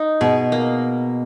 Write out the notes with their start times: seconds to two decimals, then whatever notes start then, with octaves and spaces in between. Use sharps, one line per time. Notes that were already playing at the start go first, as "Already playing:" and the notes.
Already playing: D#4
0.21 B2 G#4
0.52 A#3